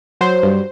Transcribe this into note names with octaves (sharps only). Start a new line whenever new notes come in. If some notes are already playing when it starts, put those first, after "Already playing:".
F#3 C5
G2